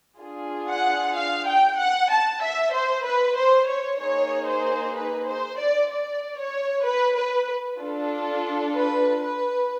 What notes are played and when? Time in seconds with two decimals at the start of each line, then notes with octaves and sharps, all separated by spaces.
0.20 D4 F4 G#4
0.68 F#5
1.16 F5
1.48 G5
1.79 F#5
2.11 A5
2.42 E5
2.74 C5
3.06 B4
3.38 C5
3.69 C#5
4.00 A#3 D#4 G#4 C#5
4.48 C5
4.96 B4
5.28 C5
5.59 D5
5.90 D5
6.39 C#5
6.86 B4
7.17 B4
7.80 D4 F4 A4
8.75 B4
9.23 B4